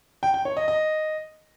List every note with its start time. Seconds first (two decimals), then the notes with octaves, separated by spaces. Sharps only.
0.23 G5
0.34 G5
0.45 C#5
0.57 D#5
0.68 D#5